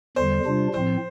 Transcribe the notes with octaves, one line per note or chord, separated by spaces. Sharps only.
E2 D3 G3 C5
C3 G3 D4 F4
A2 F3 C4 C5